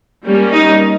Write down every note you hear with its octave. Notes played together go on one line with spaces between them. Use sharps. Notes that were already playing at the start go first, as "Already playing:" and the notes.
G3 A#3 C#4
D#4